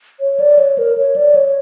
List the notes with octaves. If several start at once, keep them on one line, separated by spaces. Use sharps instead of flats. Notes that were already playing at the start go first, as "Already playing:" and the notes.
C#5
D5
C#5
A#4
C#5
D5
C#5